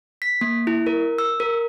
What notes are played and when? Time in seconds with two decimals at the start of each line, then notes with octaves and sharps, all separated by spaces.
0.22 B6
0.41 A#3
0.67 E4
0.87 A#4
1.18 E6
1.40 A#4